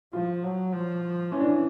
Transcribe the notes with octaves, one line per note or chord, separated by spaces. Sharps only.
F3 F4
F#3
F3
E3 C#4
D4
C#4